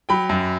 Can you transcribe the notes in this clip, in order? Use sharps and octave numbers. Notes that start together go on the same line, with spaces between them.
F#3 G5 B5
F#2